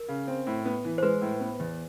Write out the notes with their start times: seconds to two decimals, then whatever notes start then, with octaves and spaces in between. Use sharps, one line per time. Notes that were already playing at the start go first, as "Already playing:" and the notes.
Already playing: A#4
0.08 C#3
0.28 C4
0.47 A2
0.65 B3
0.85 E3
0.98 C5
1.03 G#3 B4
1.22 A2
1.41 B3
1.60 E2